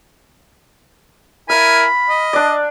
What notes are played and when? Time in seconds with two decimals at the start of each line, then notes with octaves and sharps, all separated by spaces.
1.50 E4 A#4 F5 G#5 B5
2.09 D#5
2.33 D4 D5